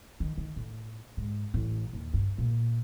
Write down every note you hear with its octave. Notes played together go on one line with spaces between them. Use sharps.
D#3
D#3
A2
G#2
A1
D#2
G2
A#2